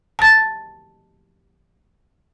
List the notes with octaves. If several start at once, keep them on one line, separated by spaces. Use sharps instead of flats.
A5 A6